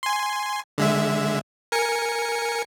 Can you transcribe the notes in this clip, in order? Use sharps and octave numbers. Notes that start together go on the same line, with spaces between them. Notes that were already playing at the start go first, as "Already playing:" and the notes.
G#5 C6
D3 G#3 E5
A#4 G#5 C#7